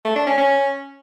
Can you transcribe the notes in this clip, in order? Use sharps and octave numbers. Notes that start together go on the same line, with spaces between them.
A3
D4
C#4
C#4